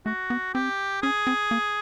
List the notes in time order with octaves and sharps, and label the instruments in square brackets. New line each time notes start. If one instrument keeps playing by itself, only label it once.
[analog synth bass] A3 [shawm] F#4
[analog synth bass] B3
[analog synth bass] C4 [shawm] G4
[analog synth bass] C#4 [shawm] G#4
[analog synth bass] C4
A#3